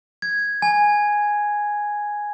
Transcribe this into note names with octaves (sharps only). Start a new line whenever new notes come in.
G#6
G#5